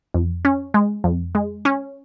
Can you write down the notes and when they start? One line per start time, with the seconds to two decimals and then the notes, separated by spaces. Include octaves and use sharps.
0.14 F2
0.45 C#4
0.74 G#3
1.04 F2
1.35 G#3
1.65 C#4